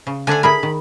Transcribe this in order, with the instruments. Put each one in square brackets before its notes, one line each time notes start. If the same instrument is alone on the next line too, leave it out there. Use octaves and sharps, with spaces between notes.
[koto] C#3
[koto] D3 D4 F#5 [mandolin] A3 G#5
[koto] E4 G#4 A#4 [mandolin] B5
[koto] D#3